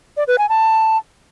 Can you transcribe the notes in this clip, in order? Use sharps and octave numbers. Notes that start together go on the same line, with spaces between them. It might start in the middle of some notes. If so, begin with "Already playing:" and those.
D5
B4
G#5
A5